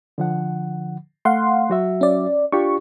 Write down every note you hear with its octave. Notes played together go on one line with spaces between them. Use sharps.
D3 F3 F#5
A3 F5 F#5 C6
F#3 F#4 E5
C#4 D5
D4 F4 G4 C#6